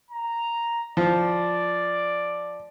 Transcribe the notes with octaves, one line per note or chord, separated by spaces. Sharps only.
A#5
F3 D5